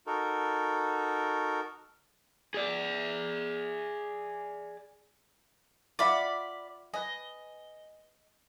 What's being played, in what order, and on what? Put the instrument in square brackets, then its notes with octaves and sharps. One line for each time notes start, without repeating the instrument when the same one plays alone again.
[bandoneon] D#4 F#4 A4 A#4
[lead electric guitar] G#4 D5
[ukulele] F4 E5 F#5 [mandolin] D5 B5
[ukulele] B4 G#5 [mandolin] D#5